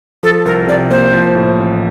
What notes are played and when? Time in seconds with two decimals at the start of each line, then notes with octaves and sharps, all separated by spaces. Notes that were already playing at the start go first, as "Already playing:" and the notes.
0.23 F3 A4
0.45 C2 A#4
0.67 C3 D5
0.90 A#3 C5
1.13 F3
1.35 A2
1.58 A1